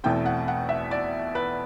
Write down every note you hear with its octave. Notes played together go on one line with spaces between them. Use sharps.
E2 B2 A3 C4 G5
F#5
F#5
E5
D5
B4